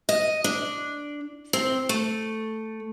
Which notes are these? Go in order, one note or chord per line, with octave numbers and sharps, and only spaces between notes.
D#5
D4
C4
A3